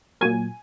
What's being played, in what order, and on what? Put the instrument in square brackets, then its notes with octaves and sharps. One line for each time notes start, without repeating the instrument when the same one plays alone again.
[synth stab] A#2 F#3 A#3 G#5